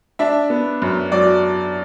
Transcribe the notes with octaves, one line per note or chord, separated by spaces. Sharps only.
D4 E5
B3
F#2
F#3 D5